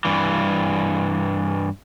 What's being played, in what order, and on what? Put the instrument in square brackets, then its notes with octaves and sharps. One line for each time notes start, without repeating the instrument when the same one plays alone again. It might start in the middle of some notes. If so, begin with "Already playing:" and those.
[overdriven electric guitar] G2 E3